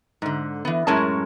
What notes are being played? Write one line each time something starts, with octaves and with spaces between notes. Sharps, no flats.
G#2 D3
E3 B3
F#2 A2 G#3 C#4 A#4 A5